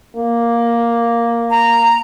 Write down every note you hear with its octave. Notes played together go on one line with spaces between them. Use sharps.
A#3
A#5